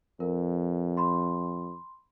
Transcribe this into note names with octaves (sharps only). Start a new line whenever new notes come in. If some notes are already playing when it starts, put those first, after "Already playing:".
F2 A#4
B5 C6